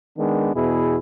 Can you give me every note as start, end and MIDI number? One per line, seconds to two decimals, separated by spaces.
0.18 0.51 51
0.18 0.51 56
0.18 0.51 59
0.18 0.51 62
0.55 0.97 40
0.55 0.97 47
0.55 0.97 64
0.55 0.97 68